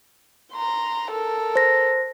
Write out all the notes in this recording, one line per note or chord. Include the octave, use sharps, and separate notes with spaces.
A#5 C6
A4 A#4
C5 A#6